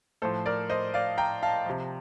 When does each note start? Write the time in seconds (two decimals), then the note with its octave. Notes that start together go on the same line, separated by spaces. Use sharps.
0.22 A2 F3 A4 C5
0.46 A#4 D5
0.70 C5 D#5
0.94 D5 F5
1.18 G5 A#5
1.43 F5 A5
1.66 C3 F3